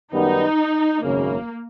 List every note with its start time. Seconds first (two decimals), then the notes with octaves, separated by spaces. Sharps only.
0.12 F#2 D#3 G3 B3 D#4
1.03 G#1 F#2 C#3 A#3